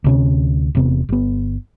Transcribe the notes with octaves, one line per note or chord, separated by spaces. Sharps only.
D2 C3 C#4
E1 C3 B3
G1 B3